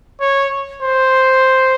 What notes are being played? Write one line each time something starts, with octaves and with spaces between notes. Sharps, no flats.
C#5
C5